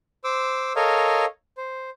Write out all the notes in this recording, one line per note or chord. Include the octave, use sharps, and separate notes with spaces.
C5 D6 E6
A4 A#4 C#5 D#5 F5
C5